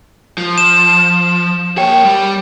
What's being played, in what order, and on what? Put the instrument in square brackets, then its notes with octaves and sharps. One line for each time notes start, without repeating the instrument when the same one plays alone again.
[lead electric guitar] F3
[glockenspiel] E7
[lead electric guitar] A#3 C#5 [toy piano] G5
[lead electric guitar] G3